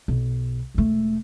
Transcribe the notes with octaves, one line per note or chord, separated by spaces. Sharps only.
B1
E1 A3